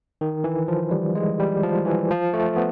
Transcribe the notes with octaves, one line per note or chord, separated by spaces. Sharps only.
D#3
E3
F3
G3
G#3
G3
F3
E3
F3
A3
B3